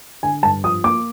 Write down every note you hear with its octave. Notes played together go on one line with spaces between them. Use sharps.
D3 G#5
G2 A5
F3 D#6
A#3 D6